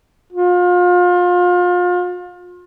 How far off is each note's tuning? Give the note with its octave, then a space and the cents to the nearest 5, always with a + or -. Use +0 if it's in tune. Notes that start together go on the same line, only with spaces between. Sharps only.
F4 +30